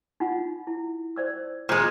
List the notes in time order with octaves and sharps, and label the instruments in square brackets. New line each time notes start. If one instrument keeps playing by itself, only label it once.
[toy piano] D#4 F4 F#5
E4
C5 D5 E6
[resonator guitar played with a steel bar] A#2 G#3 [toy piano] C5 A#5